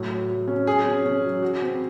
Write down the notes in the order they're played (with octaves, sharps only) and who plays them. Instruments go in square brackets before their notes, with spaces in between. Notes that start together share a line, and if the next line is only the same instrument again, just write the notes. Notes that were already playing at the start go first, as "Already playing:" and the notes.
Already playing: [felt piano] A2 F#3
F#3
F#3
C#4
[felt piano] F#3 [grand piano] G#4
[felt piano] C#4
C#4
F#3
F#4
C4